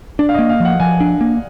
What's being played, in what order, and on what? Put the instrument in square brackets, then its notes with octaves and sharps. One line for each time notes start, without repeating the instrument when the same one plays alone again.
[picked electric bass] D4 [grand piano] D5
[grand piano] F5
D#5
[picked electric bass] A#3
[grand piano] F5
[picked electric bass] F3 [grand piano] F#5
[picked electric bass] F3 [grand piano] G#5
[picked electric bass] D4
A#3